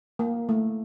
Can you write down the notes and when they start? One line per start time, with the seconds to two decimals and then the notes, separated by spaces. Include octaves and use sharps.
0.19 A#3
0.49 A3